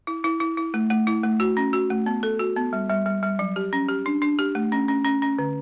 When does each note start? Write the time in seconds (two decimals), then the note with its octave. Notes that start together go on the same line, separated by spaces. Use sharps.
0.07 E4
0.24 E4
0.40 E4
0.57 E4
0.74 A3
0.90 A3
1.07 E4
1.24 A3
1.40 F#4
1.57 C#4
1.73 F#4
1.90 A3
2.06 B3
2.23 A4
2.39 F#4
2.56 B3
2.73 G3
2.89 G3
3.06 G3
3.23 G3
3.39 F#3
3.56 G4
3.73 C#4
3.89 G4
4.06 D4
4.22 D4
4.39 G4
4.55 A3
4.72 C#4
4.88 C#4
5.05 C#4
5.22 C#4
5.39 D3